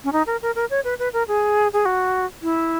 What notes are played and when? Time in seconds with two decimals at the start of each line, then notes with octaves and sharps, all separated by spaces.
0.04 C#4
0.12 D#4
0.27 A#4
0.42 A#4
0.55 A#4
0.70 C#5
0.84 B4
0.99 B4
1.13 A#4
1.28 G#4
1.73 G#4
1.85 F#4
2.42 E4